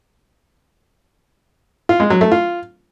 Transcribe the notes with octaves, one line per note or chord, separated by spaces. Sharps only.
F4
G#3
F#3
A3
F4